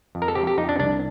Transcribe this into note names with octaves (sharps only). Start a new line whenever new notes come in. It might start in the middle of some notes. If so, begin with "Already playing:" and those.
F2
A#4
A4
C4 G4
G4
F2 D#4
D4
C2 D4